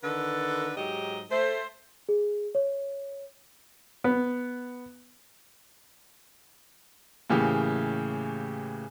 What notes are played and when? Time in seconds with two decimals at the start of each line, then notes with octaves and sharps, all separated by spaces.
0.03 D3 D#3 A4 B4
0.77 G#2 F#3 D#4 G4 D#5
1.31 A3 C5
2.09 G#4
2.55 C#5
4.04 B3
7.30 A2 C#3 E3 A#3 G4